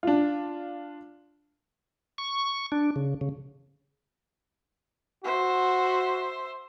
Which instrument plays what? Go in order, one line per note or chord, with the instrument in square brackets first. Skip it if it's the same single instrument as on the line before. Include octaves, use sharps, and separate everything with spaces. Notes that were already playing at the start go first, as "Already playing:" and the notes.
[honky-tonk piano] D4 F4
[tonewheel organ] C#6
D4
C#3
C#3
[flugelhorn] F#4 [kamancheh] C5 E5